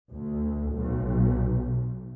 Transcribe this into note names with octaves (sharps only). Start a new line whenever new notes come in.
D2
B1